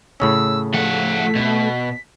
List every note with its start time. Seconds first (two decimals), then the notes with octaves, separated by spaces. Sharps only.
0.20 A2 C#3 C#4 E6
0.74 F3 A3 F#5 B6
1.35 B2